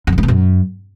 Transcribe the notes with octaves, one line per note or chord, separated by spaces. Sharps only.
F2
B2
G2
B2
F#2